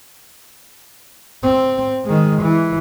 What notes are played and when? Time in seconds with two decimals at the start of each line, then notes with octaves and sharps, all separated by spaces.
1.43 C4
2.05 D#3 G#3
2.42 E3